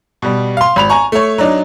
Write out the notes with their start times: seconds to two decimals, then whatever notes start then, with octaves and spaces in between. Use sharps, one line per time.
0.22 B2 G3
0.57 F5 C6
0.76 G#1 B5 F7
0.89 G#5 A#5 C#6
1.12 A3 C#5
1.38 F#3 D4 D#4